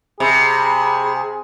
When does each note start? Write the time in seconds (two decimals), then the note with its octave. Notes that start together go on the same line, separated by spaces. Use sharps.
0.20 C3 G#4 B5